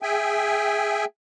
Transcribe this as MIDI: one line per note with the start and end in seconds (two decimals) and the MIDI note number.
0.02 1.05 68
0.02 1.05 76
0.02 1.05 79
0.02 1.05 80